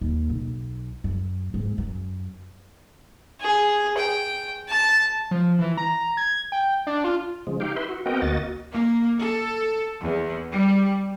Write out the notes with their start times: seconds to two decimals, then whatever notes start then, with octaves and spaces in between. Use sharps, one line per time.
0.01 D#2
0.30 B1
1.04 F#2
1.54 G#2
1.78 F#2
3.41 G#4
3.97 G5
4.69 A5
5.31 F3
5.59 E3
5.77 A#5
6.17 G#6
6.52 G5
6.87 D4
7.04 F4
7.47 C#3 F3 G#3
7.60 D#4 G4 F5 G5
7.76 E4 B4 E5 C6
7.89 F#4
8.06 B3 C4 F#4 A#4 D#5 G5
8.22 D2 A#3 F#4 D#5 A6
8.73 A#3
9.18 A4
10.04 E2
10.51 G3